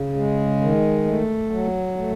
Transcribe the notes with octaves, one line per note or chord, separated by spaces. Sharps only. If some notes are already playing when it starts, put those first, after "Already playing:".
Already playing: C#3
G#3
D#3
A3
F#3
A3